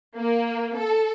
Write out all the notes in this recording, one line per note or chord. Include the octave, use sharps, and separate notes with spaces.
A#3
A4